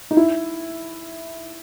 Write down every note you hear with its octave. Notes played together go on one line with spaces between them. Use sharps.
D#4
E4